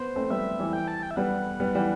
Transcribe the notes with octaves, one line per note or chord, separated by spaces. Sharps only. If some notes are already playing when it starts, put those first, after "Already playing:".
Already playing: B3 C5
A3 C4
G3 B3 E5
E3 G3
G5
A5
G5
E5
G3 B3 F#5
G3 B3
E3 G3